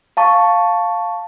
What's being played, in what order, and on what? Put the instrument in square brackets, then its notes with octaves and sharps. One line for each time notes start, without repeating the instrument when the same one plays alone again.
[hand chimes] F5 A5 C#6